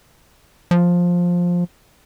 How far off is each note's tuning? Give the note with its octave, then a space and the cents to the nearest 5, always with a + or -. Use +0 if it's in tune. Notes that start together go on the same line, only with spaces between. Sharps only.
F3 +10